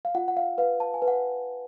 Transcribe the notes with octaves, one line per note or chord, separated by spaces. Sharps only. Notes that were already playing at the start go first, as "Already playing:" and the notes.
F5
F4 F#5
F#5
F5
B4 F5
A5
G#5
B4
F#5